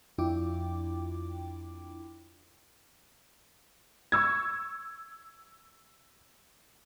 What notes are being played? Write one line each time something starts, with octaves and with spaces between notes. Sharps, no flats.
F2 D4 E4 F4 G5 D6
C#6 E6 G#6